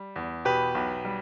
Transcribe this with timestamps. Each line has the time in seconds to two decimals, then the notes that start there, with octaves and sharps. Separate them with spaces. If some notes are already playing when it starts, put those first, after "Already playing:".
Already playing: G3
0.16 E2
0.45 B2 G4 B4
0.75 B1
1.05 G3